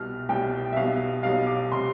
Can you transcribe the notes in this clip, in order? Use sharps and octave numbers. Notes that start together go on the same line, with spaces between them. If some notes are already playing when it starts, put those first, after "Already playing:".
Already playing: C2 B2 G3 F6
C2 B2 G3 G5
E5
B1 B2 G3 F5
B1 B2 G3 F5
D6
C3 G3 C6